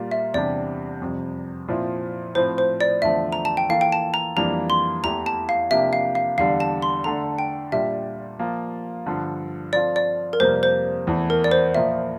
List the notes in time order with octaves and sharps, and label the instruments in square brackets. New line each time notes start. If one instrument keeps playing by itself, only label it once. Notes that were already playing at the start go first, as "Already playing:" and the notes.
Already playing: [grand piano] A#2 G3 A#3 F4
[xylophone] E5
[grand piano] E2 C3 G3 D4 G4 [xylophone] D5
[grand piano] F2 C3 G3
A#2 F3 C4 E4
[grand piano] A2 F3 C4 [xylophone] C5
[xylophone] C5
D5
[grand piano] E2 D3 F3 A3 [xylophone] E5
[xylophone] A#5
A5
G5
[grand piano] E3 A#3 F4 A4 [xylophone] F5
[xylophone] G5
A5
A#5
[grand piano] F2 E3 G3 A#3 D4 [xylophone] A#5
[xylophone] C6
[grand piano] E2 E3 A3 E4 G4 [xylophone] A#5
[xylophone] A5
F5
[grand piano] C3 F3 A#3 D4 G4 [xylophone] E5
[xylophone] F5
F5
[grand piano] E2 D3 G3 [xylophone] F5
[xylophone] A5
C6
[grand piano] D3 A3 D4 A4 [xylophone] A#5
[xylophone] G5
[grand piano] A#2 G3 D4 G4 [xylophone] E5
[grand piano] F3 A#3 F4
G2 D3 F3
[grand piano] F3 C4 F4 A4 [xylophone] D5
[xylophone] D5
A#4
[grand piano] F2 C3 G3 A#3 [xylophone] C5
[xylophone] C5
[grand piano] E2 E3 A3
[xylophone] A#4
D5
C5
[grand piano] A#2 F3 A#3 F4 A#4 [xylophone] E5